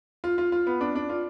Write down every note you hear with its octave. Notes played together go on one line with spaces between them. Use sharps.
F4
F4
F4
B3
D4
D4
F4